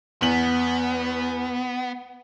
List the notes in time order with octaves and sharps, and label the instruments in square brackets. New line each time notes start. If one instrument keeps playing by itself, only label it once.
[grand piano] E2 F#7 [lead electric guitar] B3